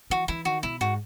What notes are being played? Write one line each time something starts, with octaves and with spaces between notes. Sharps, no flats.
E3 F#4
E3 E4
D#3 F#4
B2 E4
G#2 F#4